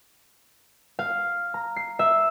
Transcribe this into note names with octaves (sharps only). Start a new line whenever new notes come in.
F5
A#5
C7
E5